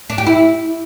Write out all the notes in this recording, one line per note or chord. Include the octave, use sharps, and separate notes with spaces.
D4
G4
E4